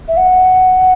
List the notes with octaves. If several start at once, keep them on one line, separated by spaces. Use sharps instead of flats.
E5
F#5